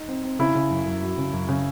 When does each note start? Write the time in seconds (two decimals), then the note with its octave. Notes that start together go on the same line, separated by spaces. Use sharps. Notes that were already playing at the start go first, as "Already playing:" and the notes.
Already playing: D#4
0.08 C4
0.24 C4
0.39 C#3 E4
0.55 C#3
0.70 F#2
0.86 F#2
1.02 F#3
1.17 C#3
1.33 F#2
1.49 C#3